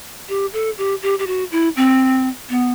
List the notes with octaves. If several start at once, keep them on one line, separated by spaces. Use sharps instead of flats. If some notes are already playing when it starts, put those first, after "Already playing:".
G4
A4
G4
G4
G4
F#4
E4
C4
B3